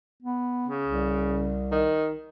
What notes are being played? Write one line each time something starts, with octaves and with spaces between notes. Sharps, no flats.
B3
C#3
C2
D#3